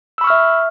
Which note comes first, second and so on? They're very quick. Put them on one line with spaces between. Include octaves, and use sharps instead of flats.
E6 B5 C#6 F6 E5